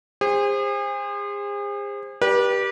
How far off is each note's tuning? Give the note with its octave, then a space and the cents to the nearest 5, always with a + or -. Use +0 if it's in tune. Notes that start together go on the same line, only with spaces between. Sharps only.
G#4 -40 C5 +10
G4 +0 B4 -35 D5 +0